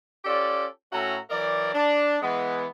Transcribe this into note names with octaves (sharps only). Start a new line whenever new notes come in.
C#4 F4 G4 A4 D5
A2 C#4 F#4 A4 E5 A#5
E3 F#3 A#4 D5
D4
E3 G#3 B3